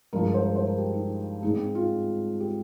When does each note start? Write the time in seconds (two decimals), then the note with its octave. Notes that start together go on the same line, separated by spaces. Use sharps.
0.13 G2 F3 G#3 A#4
0.23 A#4
0.34 C5
0.46 A#4
0.56 C5
0.67 A#4
0.78 G4
0.94 D#4
1.43 G#2 D#3 G#3 D#4
1.54 C4
1.75 F4
2.40 G4